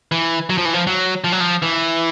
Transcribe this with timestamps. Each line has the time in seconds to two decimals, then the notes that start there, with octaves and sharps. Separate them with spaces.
0.12 E3
0.50 F#3
0.58 F3
0.65 E3
0.74 F3
0.87 F#3
1.24 F3
1.32 F#3
1.40 F3
1.62 E3